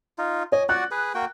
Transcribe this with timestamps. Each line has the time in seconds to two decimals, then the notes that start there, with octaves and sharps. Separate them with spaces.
0.18 D#4 F4
0.52 C#5 D#5 G#5
0.69 F#4 D5 F#5 F#6
0.91 G#4 B4
1.14 A#3 F#4 G5